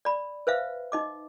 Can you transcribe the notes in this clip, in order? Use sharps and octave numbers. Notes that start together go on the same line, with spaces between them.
D5 B5
B4 C5 E5 F5
D#4 D#5 D6